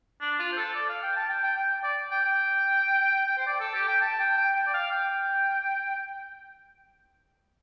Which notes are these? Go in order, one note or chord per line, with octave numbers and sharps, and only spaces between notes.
D4
F4
C5
A4
D5
F5
G5
A5
G5
G5
G5
D5
G5
G5
C5
D5
A4
G4
G5
A5
G5
G5
G5
D5
F5
G5